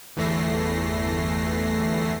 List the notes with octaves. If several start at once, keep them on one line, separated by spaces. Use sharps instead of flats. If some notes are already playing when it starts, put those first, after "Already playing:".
G1 E2 E3 A3 A#6 C7